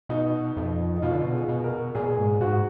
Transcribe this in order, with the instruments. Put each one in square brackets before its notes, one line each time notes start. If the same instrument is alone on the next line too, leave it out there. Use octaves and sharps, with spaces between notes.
[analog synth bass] B2 [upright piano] D#4
[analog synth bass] F2
[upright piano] D#4
[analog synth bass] B2 [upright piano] F4
[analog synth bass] D3
B2
[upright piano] G#4
[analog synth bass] B2
[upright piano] A#4
[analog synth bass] A#2 [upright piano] G#4
[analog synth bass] B2
A#2
G#2
[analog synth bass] G#2 [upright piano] F#4